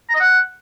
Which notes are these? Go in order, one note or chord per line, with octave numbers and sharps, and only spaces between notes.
A#5
D#5
F#5